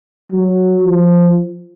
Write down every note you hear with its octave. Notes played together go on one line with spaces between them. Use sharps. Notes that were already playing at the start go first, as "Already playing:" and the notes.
F#3
F3